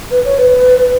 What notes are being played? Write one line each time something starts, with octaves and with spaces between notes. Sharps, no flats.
B4
C#5
B4